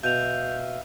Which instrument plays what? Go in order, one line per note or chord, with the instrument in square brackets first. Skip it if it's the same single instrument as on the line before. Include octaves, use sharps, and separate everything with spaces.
[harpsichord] B2 [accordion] E5 F5 [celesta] G6 F7